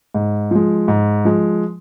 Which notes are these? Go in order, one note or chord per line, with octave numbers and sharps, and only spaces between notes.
G#2
F3 G#3
G#2
F3 G#3